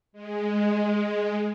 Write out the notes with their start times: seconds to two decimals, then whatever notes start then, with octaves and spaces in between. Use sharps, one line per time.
0.13 G#3